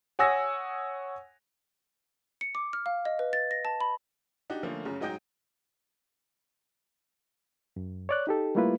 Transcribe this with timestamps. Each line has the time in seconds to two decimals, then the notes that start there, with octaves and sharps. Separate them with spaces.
0.19 C#5 F#5 G#5 D#6 E6 A#6
2.41 C#7
2.55 D6
2.73 F6
2.86 F5
3.05 D#5
3.19 B4
3.33 A6
3.51 A#6
3.65 A5
3.80 B5
4.50 D4 D#4 F#4 G4
4.63 D3 F3 A3 A#3 C#4
4.85 F#2 C#3
5.00 G#2 F#3 D#4 D#5 G5 G6
7.76 F#2
8.09 C#5 D5 F#6
8.27 D#4 G4 A4
8.55 G3 A3 A#3 E4 F4 B4